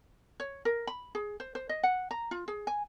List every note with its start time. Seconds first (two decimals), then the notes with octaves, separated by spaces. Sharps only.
0.40 C#5
0.65 A#4
0.87 B5
1.15 G#4
1.40 C5
1.55 C5
1.69 D#5
1.83 F#5
2.11 A#5
2.31 F4
2.48 G#4
2.67 G#5